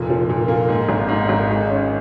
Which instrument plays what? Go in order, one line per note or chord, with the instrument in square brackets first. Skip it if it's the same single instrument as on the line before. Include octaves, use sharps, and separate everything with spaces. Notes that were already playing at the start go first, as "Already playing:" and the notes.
Already playing: [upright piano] F1 A#2
F3
A#2
A#3
G#2
G#1
G#2
G#1
G#3
C#4